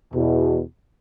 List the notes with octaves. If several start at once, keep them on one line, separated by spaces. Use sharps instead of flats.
E2 B2